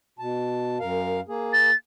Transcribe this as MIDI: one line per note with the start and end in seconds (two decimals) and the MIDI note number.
0.19 0.78 47
0.19 0.78 81
0.80 1.20 42
0.80 1.20 70
0.80 1.20 77
1.28 1.70 58
1.28 1.70 68
1.53 1.75 93